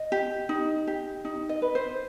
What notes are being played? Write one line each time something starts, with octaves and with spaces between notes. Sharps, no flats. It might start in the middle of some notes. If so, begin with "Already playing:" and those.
Already playing: D#5
G4
D#4
G4
D#4
D#5
B4
C5